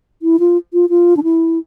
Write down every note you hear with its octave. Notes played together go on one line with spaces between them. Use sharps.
E4
F4
F4
F4
D4
E4